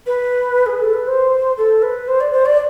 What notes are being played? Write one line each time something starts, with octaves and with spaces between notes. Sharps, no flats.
B4
G#4
A4
B4
C5
A4
B4
C5
D5
C5
D5